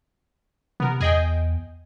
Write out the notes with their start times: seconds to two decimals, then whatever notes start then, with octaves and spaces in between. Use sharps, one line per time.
0.80 C3 B3 A#4
1.01 E2 G#4 D#5 G5